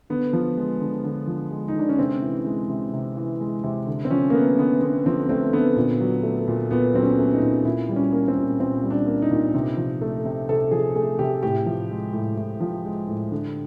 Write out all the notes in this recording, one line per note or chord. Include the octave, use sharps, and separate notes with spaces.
D3 B3
F3
G#3
D3
D3
F3
G#3
D#4
D3 D4
C#4
C3 C4
E3
G#3
C3
C3
E3
G#3
C3
D3
C4
F3 C#4
A#3
A3 B3
D3 B3
D3 B3
F3 C4
A3 C4
D3 B3
A#2
F#3
A3
A#2
A#2 B3
F#3 C4
C#4
A3
D#4
A#2
A#2 E4
G3
C#4
A#3
C4
A#2
A#2 C4
G3
D4
A#3
D#4
A#2
C3
F3
A3
C3
C3 A4
F3 G#4
A3 G#4
C3 G4
A2 G4
F3
G#3
A2
A2
F3
G#3
A2
D3